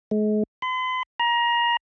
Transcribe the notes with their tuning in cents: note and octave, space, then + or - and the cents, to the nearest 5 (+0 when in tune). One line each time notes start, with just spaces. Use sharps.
G#3 +40
C6 -45
A#5 +25